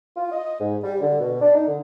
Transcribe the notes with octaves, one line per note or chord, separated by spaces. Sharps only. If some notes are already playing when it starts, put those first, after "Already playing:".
F4
D#5
G#2
G3
D3
B2
D4
D#4
D3